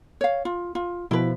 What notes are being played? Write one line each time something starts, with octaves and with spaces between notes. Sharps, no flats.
C#5 F5
F4
F4
B2 F3 E4 B4